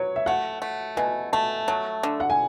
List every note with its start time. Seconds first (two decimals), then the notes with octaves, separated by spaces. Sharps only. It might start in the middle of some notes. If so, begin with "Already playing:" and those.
Already playing: F#3 B4 C#5
0.16 E5
0.26 A3 F#5
0.62 A3
0.97 B2 G#5
1.33 A3 A5
1.68 F#3 A5
2.03 D3
2.20 F#5
2.30 G#5